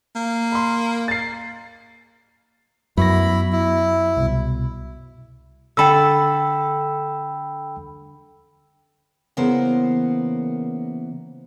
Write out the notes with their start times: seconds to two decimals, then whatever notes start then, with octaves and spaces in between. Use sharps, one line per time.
0.16 A#3
0.52 B5 C6
1.08 A6 C7
2.97 F#2 B3 E4 B5 C#6 A#6
3.52 E4
4.17 C2 B2
5.77 D3 A4 G5 B5 E6
9.37 C#3 E3 A#3 B3 A#4 C5